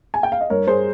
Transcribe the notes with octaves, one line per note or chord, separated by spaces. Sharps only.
G#5
G5
F5
D#5
G2 A#4 C#5
G2 G#4 C5